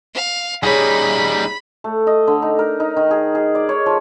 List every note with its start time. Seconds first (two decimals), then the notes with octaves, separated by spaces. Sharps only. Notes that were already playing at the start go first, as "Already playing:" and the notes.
0.14 F5
0.63 G3 D#4 G#4 C#5 B5
1.84 A3
2.07 D#5
2.27 D3
2.42 D#4
2.59 A#4
2.80 D#4
2.96 D#3
3.11 G#4
3.35 G#4
3.55 D5
3.69 C#5
3.86 F3